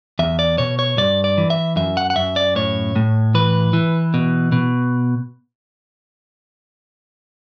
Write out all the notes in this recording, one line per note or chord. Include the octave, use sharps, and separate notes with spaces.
E2 E5
D5
B2 C#5
C#5
G2 D5
D5
E3
E5
F#2 E5
F#5
F#5
F#2 E5
D5
A2 C#5
A2
E3 B4
E3
B2
B2